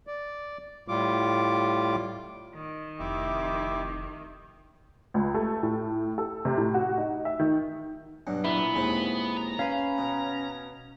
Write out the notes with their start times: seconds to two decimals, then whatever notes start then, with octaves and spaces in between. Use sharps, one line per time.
0.07 D5
0.88 A2 G3 F4 D6
2.54 D#3
3.00 F1 E4 G4 E5 D6
5.14 C#2
5.34 A3
5.63 A2
6.18 A4
6.45 C3
6.58 A2
6.74 F#4
6.98 D#4
7.25 E5
7.39 D#3
8.27 G2 B2 F#3
8.44 A#2 E3 B3 E4
8.75 D#2 G#3 C4
9.37 A#5
9.59 C#4 B4 F5
9.98 B2